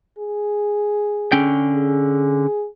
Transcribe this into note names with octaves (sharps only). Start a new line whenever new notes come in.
G#4
D3 C#4 G5
G#4